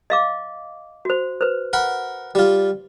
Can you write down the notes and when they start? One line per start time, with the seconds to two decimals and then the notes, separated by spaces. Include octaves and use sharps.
0.10 D#5 F5 D6
1.05 F#4 C5
1.41 B4 C5
1.73 A#4 F#5 B5
2.35 G3 F4